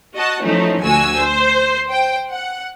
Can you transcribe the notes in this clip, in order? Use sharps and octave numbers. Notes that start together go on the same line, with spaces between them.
F#4 D#5 A5
E3 F3 A3 C#4 D#4
D2 F#4 G#5 E6
C5
C5 G5
F#5